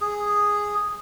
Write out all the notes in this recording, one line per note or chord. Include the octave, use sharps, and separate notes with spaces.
G#4